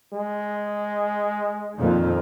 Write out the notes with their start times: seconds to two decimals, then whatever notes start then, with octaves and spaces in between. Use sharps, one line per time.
0.13 G#3
1.77 F2 A#2 D#3